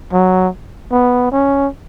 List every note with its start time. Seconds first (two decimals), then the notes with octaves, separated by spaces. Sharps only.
0.13 F#3
0.91 B3
1.32 C#4